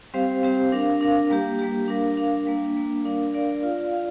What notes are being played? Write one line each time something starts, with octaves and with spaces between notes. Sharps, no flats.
G3 C4 G4 C5 F5
G3 C4 G4 C5 F5
D4 A#4 F5
D4 A#4 F5
G3 A#3 G4
G3 A#3 G4
D4 A#4 F5
D4 A#4 F5
G3 A#3 D4
G3 A#3 D4
D4 A#4 D5 F5
D4 A#4 D5 F5
F4 D5 F5
D5 F5